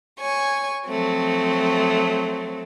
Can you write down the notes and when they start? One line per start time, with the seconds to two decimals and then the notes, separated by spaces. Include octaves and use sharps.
0.20 C#5 G#5 C#6
0.87 F3 F#3 A3 C4